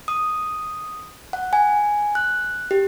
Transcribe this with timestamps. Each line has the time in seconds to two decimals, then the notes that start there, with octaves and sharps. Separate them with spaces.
0.08 D#6
1.33 F#5
1.53 G#5
2.15 F#6
2.71 G4